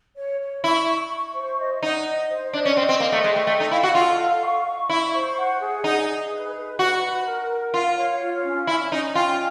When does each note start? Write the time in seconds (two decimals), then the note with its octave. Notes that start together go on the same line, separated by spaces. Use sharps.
0.17 C#5
0.40 C#5
0.64 E4 C#6
0.88 C#6
1.11 C#6
1.35 C5
1.59 D#5
1.83 D#4 F#5
2.06 D#5
2.30 C5
2.53 D4 D#5
2.65 C#4
2.77 C4 D#5
2.89 C4
3.00 A#3 D#5
3.12 A3
3.24 G#3 G5
3.36 A3
3.47 A3 A4
3.60 D#4
3.71 E4 F5
3.83 F#4
3.95 F4 A4
4.19 F5
4.42 C#6
4.66 C#6
4.89 E4 C#6
5.13 C5
5.37 F#5
5.61 G#4
5.84 D#4 G#4
6.08 G#4
6.31 B4
6.55 B4
6.79 F#4 B4
7.03 B4
7.26 A#4
7.50 A#4
7.74 F4 F5
7.97 C#5
8.20 F4
8.44 C#4
8.67 C#4 E4
8.91 C#4 D#4
9.15 F4 G5